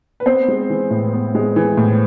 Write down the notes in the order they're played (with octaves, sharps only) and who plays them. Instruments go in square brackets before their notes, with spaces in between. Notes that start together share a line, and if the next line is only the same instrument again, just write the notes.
[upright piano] B4
B3 C4 C5
G#3
E3
A2
B3
G#3
E3
A2